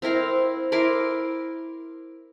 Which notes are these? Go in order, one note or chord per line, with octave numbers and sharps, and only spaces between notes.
C4 E4 A#4 F5
E4 A#4 C6 D6